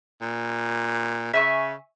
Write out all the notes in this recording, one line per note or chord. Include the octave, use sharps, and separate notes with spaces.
A#2
C#3 E5 G#5 C#6